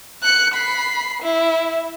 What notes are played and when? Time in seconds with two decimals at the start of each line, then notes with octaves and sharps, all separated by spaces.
0.23 F#6 C#7
0.54 B5 C7
1.23 E4